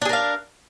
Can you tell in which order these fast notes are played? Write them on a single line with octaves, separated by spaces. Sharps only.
D4 G#4 A#4 F5